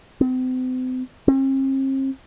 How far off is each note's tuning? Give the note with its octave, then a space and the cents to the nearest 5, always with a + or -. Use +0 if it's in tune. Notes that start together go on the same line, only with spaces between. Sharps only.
C4 -40
C4 +45